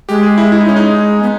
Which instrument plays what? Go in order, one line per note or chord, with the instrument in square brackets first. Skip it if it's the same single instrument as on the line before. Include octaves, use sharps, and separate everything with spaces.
[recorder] G#3 [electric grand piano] G4
[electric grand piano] G#4
E4
E4
D#4
[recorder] G#3 [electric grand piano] C#4
[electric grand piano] D#4
[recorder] B3